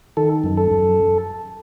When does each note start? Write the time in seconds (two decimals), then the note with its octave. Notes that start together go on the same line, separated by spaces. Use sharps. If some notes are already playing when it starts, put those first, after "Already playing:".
0.17 D#3 A4
0.44 F#2
0.57 A4
0.71 F#2